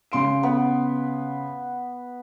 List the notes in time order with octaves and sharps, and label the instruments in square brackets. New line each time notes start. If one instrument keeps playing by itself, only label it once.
[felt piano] C#3 C6 D7
[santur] B3